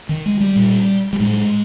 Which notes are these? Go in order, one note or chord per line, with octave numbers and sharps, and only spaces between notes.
D#3
G#3
G3
A#2
G3
A2 G#3